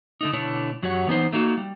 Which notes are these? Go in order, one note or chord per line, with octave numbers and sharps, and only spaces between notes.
D3 A3 D#4
B2 D3 A3 D4 E4 C#5
F#2 F#3 F#4 G4 C#5 F#5
E3 B3 D#4 C5
A3 A#3 D#4 F#4
G3